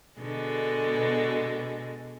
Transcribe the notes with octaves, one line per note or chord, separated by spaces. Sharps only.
B2 D3 G#3 A4